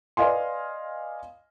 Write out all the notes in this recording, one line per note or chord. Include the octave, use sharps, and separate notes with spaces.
B4 D5 D#5 F5 G#5 C6